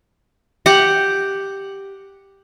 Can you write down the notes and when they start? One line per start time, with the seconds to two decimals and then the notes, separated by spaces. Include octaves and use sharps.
0.66 G4 F#5